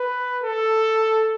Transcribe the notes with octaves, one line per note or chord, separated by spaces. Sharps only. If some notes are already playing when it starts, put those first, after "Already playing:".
Already playing: B4
A4